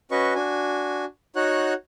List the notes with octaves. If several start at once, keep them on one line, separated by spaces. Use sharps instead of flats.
C#4 F#4 B4 D#5 C#6
D4 F#4 G#5
D#4 F#4 C#5 F#5 F#6